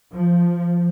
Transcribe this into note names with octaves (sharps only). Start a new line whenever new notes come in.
F3